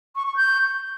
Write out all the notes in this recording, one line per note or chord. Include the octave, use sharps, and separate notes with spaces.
C#6
C#6
G6